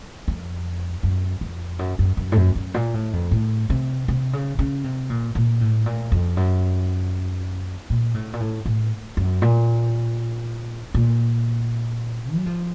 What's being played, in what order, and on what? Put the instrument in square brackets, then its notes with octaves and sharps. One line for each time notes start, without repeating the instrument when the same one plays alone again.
[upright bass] F2
F#2
F2
F#2
F#2
F#2
A2
F#2
F#2
A#2
A2
F2
A2
C3
C3
C#3
C#3
C3
A#2
A#2
A2
A#2
F2
F#2
A#2
A2
A#2
A2
A2
F#2
A#2
A#2
F#3
F3